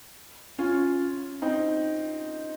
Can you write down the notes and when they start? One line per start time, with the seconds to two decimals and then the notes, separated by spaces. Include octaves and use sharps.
0.59 C#4 F4
1.42 C4 D#4